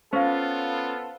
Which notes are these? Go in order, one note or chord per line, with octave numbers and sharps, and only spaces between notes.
B3 C#4 F4 A4 C5 F5